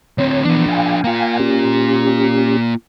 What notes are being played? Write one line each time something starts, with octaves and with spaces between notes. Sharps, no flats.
D2 C4 C#5
E3 F3 B3 D4
F5 G5 G#5
A#3 F4
C#4 G4